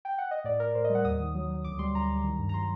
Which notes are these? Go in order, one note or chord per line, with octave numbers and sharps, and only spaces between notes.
G5
F#5
D#5
A2 D5
A2 A#4
A2 C5
D#5
G3
F#5
D#2 D#6
D#3
F#3
F#3
D2 D6
G3 C6
D2 A#5
D2
D#3
G2
A#5
F#3 C6